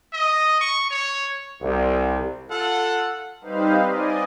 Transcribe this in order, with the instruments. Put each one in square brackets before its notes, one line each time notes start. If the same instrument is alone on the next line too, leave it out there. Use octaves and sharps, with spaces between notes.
[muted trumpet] D#5
C#6
C#5
[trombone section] C2
[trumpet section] F4 A4 F#5
[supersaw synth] G3 C4 D#4 B4 C5 F5
D5 D#5 G#5